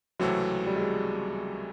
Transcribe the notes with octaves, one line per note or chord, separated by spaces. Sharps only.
C#2 C3 E3 F#3 A3 C4
G3
G#3